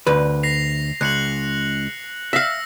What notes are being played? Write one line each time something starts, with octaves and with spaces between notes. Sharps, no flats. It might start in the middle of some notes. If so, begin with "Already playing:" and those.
D2 B4
A#6 C7 F7
C#2 F#6 C#7 F#7
E5 F5 E6 A#6